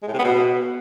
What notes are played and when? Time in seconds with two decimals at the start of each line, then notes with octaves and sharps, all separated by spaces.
0.02 G#3
0.08 A2
0.13 C3
0.19 B3
0.24 B2